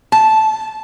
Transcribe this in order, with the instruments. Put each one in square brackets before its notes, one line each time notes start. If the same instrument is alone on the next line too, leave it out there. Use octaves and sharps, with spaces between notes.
[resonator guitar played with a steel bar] A5